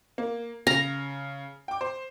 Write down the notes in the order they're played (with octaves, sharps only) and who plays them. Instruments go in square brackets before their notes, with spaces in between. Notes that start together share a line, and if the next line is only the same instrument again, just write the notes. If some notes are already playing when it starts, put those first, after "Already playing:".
[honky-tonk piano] A#3
[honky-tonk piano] C#3 [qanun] A#5
[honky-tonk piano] G5 D6
C5